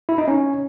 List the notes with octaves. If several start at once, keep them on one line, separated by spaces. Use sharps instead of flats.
E4
D#4
C#4